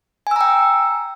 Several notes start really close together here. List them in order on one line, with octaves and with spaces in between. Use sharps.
G#5 E6 A#5 G5